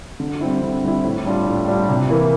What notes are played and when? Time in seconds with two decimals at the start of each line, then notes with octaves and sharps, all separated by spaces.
0.20 D3
0.41 G3 C4 E4
0.62 D3
0.83 G3 C4 E4
1.04 A2
1.25 G3 D4 F4
1.46 A2
1.68 G3 D4 F4
1.89 C3
2.09 E3 A#3 E4